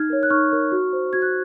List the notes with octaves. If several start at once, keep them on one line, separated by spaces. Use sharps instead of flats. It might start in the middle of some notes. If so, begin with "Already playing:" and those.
Already playing: D#4 F6 G#6
A#4 C#5
F#6
D#4 C#6 F6
A#4 C#5
F#4
C5
F#4 G#6
F#6